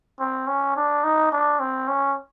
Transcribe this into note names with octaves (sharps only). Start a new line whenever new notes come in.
C4
C#4
D4
D#4
D4
C4
C#4